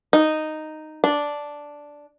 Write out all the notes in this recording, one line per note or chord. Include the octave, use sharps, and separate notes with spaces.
D#4
D4